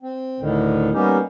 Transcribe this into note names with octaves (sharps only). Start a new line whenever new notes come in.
C4
D2 A2 D3 D#3
G3 A#3 B3 C#4 D#4 G4